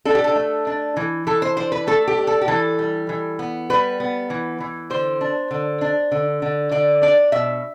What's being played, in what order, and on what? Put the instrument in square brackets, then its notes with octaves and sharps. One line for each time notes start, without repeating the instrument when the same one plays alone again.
[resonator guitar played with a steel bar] D4 A4
G4
A4
A3
D4
E3
E3 A4
C5
D4 C5
B4
A3 A4
G4
D4
A4
G4
E3 A4
G3
E3
B3
G3 B4
B3
E3
E3
D3 C5
D4
D3
D4
D3
D3
D3 D5
D4 D5
B2 E5